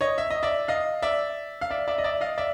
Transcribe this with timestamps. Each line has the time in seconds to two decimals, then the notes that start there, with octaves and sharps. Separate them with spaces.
0.01 C#5 D#5
0.18 E5
0.30 D#5
0.43 D5 E5
0.68 D#5 F5
1.02 D5 E5
1.61 F5
1.70 D5 E5
1.88 D5 E5
1.98 D#5
2.04 D5 E5
2.21 D#5 F5
2.38 D5 E5